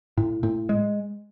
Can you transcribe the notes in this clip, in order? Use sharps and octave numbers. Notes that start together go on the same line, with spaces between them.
A2
A2
G#3